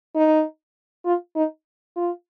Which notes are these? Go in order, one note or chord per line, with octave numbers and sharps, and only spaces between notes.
D#4
F4
D#4
F4